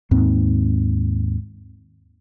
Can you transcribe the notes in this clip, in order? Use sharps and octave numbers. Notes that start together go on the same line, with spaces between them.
D#2 G#2 C4